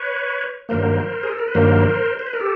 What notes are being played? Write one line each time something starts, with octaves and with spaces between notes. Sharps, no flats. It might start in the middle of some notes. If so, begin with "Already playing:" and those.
Already playing: B4 C#5
G2 D#3 F#3 A#3 A#4 C5
G#4
A4
A#4
B4
G2 D#3 F#3 A#3 A#4 C5
C5
B4
A#4
G4 A4